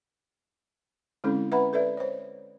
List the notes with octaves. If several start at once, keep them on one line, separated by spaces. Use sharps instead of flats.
D3 G#3 C4 C#4 E4 A4
B4 E5 F#5 A#5 B5
A4 B4 D5 E5
C5 C#5